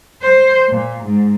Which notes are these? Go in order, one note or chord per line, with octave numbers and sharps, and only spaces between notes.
C5
A#2
G#2